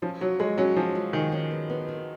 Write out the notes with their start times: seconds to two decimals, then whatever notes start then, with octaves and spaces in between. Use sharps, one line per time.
0.02 F3 C#4
0.21 F#3 C#5
0.39 G#3 C#5
0.58 F#3 C#4
0.76 F3 G#4
0.95 G#3
1.13 D#3 G#4
1.32 C#4
1.51 B3
1.70 B3
1.88 D#3